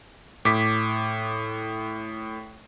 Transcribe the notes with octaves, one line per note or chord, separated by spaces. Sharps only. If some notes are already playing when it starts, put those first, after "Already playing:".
A2 D6 B6